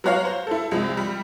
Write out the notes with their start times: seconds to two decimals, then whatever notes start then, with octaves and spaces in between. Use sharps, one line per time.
0.04 F#3 B3 F#4 C#5 F5
0.25 C5
0.47 E4 A4
0.71 C2 F3 G#3
0.97 G3